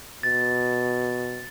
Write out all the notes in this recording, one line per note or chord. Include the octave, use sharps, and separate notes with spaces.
B2 A6